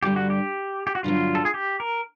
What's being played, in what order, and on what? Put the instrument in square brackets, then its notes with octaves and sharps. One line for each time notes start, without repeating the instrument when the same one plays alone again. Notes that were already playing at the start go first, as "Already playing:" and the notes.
[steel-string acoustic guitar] G2 D3 G3 [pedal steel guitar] G4
[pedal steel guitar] F#4
G4
G4
F#4
[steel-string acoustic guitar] G2 D3 F#3 [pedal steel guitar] F4
[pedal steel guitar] A4
G#4
G4
A#4